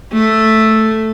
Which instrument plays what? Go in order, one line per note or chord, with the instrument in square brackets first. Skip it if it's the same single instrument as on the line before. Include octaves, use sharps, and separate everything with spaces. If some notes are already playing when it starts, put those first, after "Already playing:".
[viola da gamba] A3